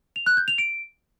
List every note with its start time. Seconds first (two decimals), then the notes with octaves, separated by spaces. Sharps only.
0.16 F7
0.26 F#6
0.37 G6
0.48 F7
0.58 D7